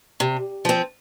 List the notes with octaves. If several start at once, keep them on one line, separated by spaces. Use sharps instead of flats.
C3
F3 C4